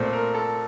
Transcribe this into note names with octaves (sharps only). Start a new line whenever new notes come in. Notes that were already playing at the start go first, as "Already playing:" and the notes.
Already playing: A#2 A3 C4
A#4
A4